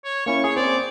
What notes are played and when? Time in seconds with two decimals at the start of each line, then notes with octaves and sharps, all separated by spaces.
0.05 C#5
0.26 A#3 C#4 E4 C#6
0.44 G#4 C#5
0.56 C4 C5 D5